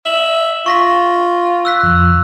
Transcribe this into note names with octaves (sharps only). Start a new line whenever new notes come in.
E5 F#7
F4 C#6 A#6 B6
E6 F#6 B6
F2